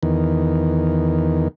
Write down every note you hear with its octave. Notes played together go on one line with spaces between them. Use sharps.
E2 D#3